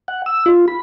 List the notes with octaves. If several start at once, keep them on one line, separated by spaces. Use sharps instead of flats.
F#5
E6
F4
B5